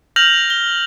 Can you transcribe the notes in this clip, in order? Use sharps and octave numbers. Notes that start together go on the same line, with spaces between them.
F6 G6 A#6 F7 F#7
G7